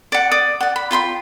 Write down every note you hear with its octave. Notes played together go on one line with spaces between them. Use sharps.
D5 F#5
D5 D#6
D5 F#5
B5
F4 G5 B5 C6